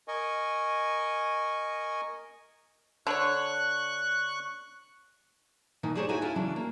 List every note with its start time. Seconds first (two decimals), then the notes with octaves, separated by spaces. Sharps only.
0.08 A#4 D#5 G#5 C#6
3.07 D3 C#5 C#6 F#6
5.83 B2 D#3 E3 A#3 D#4
5.95 D4 G4 G#4 A#4 C5 C#5
6.09 D#4 E4 F#4 A4 G#5
6.21 D#2 C#4 E4 F4 G#5
6.35 C#3 E3 F#3 D4
6.56 A#3